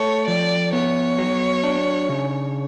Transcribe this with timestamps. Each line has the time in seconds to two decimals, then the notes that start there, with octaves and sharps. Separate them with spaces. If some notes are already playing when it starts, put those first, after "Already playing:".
Already playing: A3 A4 C#5
0.28 F3 D5
0.73 B3 C#5
1.18 F#3
1.63 D4
2.09 C#3